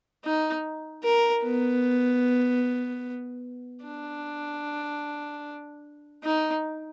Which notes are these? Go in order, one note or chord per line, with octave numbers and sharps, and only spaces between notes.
D#4
A#4
B3
D4
D#4